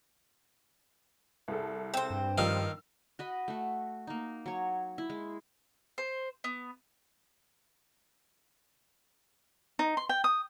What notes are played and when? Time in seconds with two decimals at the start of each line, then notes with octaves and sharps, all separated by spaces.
1.48 C2 G#4 A4
1.94 C4 C5
2.10 G2
2.38 D#3 F3 G3 F5 E6
3.19 F#4 D#5 B5
3.48 A3 F#4
4.07 A#3 D#4
4.46 F#3 C#5
4.98 E4
5.10 G#3
5.98 C5
6.44 B3
9.79 D#4
9.97 C6
10.09 G5
10.24 D#6